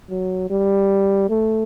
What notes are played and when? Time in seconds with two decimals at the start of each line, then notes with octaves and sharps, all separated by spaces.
0.10 F#3
0.50 G3
1.29 A3